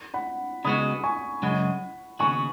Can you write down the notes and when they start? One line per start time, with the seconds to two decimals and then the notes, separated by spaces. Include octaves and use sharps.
0.14 F#5 B5
0.65 C#3 G#3 B3 F#4 B5 D#6
1.04 G#5 C#6
1.42 F#2 C#3 G#3 F#5 B5
2.19 D#2 C#3 B3 F#4 G#5 C#6